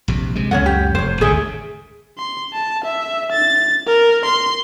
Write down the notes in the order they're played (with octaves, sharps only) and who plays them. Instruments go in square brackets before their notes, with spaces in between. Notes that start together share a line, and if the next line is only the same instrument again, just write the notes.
[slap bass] A#1 C3
C3 G#3
[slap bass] C#2 F#2 [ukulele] C#4 C#5 F#5
[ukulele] G4
[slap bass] F1 [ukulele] C5 C#5
[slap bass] G#1 D2 C3 [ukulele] G#4 E5
[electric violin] C6
A5
E5
A6
A#4
C6